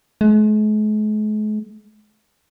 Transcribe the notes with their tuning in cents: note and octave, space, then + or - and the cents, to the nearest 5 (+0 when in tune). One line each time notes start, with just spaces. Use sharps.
G#3 +45